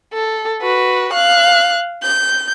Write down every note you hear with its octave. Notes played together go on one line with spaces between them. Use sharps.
A4
F#4 B4
F5 F#6
G6